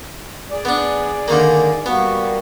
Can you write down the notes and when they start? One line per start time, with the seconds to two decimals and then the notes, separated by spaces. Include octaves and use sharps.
0.51 G#4 D5
0.65 B3 D4
1.28 D3 D#3 A#3
1.86 G3 A#3 B3 F#4